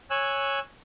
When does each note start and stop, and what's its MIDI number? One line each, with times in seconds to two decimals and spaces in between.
0.10 0.59 73
0.10 0.59 80
0.10 0.59 88
0.10 0.59 90